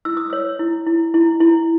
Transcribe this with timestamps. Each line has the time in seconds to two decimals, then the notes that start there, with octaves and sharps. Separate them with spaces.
0.05 E4 E6
0.17 D#6
0.30 C#5 E6
0.59 E4
0.86 E4
1.14 E4
1.40 E4